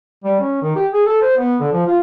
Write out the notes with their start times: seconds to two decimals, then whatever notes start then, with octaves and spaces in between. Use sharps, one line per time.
0.24 G3
0.40 C#4
0.62 D#3
0.76 G4
0.94 G#4
1.06 A4
1.22 C5
1.37 B3
1.60 D3
1.73 F3
1.87 F4